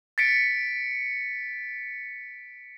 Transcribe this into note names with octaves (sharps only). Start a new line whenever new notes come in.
A6 B6 C#7 D7